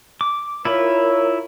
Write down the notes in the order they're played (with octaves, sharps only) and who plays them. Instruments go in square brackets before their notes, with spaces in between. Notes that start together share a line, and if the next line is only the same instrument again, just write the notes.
[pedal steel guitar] D6
[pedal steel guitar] E4 F4 B5 [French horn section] A#4 C#5